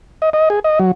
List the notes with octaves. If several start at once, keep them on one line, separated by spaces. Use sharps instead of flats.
D#5
D#5
G#4
D#5
F#3